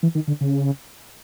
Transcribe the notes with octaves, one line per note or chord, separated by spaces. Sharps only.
E3
D#3
D3
C#3